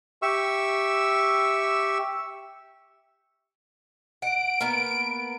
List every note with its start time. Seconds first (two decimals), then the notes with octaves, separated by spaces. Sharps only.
0.22 G4 E5 C#6 E6
4.22 F#5 D7
4.61 A#3 B3